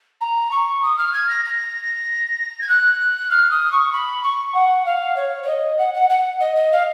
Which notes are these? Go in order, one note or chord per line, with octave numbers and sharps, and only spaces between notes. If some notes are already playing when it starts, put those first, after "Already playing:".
A#5
C#6
D#6
F6
G#6
A#6
A#6
G#6
F#6
F6
D#6
C#6
B5
C#6
F#5
F5
C#5
C#5
D#5
F#5
F#5
F#5
D#5
D#5
F5